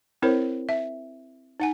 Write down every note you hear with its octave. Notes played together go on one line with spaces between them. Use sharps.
C4 E4 A#4 C5 C#5
E5
D#4 F#5 G#5